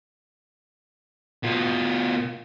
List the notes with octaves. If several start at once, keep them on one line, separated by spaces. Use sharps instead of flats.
B2 F4